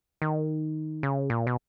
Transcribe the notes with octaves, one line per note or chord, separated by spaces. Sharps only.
D#3
C#3
A#2
B2